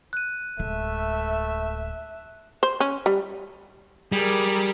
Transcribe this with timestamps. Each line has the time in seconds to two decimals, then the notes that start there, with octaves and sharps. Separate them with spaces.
0.13 F#6 D#7
0.59 D1 G#3 A3 E5
2.63 C5
2.80 C#4
3.06 G3
4.12 G3 G#4 A#4